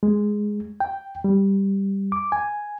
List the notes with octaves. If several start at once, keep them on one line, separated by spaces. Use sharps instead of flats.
G#3
G5
G3
D6
G#5